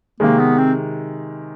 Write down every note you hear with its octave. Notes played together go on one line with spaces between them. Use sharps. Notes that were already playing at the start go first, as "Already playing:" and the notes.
C3 D#3 G#3 A#3
B3
C4